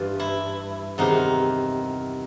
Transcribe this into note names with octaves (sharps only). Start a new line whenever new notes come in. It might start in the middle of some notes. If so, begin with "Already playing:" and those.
Already playing: G2 E3 F4
E4
E2 C3 D#3 D#4